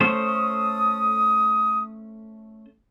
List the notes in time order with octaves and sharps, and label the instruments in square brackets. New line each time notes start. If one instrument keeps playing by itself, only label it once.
[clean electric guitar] A3 C#4 C5 [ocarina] D#6